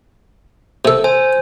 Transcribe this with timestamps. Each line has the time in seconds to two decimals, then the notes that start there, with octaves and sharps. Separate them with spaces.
0.85 C3 A4
1.04 C5 G#5